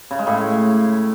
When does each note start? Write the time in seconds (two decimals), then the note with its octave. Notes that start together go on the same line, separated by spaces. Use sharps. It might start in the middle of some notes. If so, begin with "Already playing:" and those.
0.11 C#3
0.19 G#3
0.27 A2